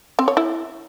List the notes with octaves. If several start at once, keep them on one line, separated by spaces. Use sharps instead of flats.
C4
C#5
E4